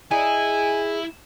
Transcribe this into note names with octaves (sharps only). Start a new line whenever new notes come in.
D#4 E4 G#4 G#5